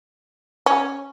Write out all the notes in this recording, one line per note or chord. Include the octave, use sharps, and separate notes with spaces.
C#4